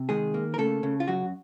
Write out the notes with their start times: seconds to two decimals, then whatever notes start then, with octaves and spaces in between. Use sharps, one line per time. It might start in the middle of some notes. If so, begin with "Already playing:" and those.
Already playing: C3
0.09 D#3 G#3 G#4
0.34 A#3
0.54 A#4
0.58 C#3 A3 A4
0.83 C#3
1.00 F4
1.08 F#2 F#3 F#4